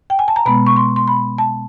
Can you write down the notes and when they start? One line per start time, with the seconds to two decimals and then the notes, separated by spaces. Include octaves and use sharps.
0.10 G5
0.19 G#5
0.28 A5
0.36 A#5
0.45 B2 G#3 B3 B5
0.67 C#6
0.76 C6
0.96 C6
1.08 B5
1.38 A5